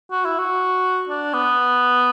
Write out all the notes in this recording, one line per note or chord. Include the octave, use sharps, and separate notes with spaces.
F#4
E4
F#4
D4
B3